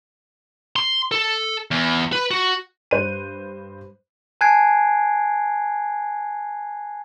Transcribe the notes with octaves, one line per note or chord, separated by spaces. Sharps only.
C6
A4
E2
B4
F#4
G2 C5 F#6 D#7
G#5 A5 F#6 G#6 C7 D7